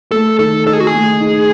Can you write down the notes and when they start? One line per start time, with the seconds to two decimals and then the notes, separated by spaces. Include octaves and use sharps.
0.12 A3 A4
0.39 D#3 A4
0.67 D#4 A4
0.73 G#4
0.80 F#4
0.87 G#4
0.93 A3
1.20 D#4